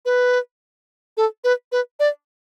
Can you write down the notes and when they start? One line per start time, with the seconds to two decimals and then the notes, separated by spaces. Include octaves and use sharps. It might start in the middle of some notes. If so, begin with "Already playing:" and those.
0.05 B4
1.17 A4
1.44 B4
1.72 B4
2.00 D5